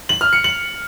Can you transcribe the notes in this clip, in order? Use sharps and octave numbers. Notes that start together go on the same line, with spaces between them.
F#7
F6
C#7
F#7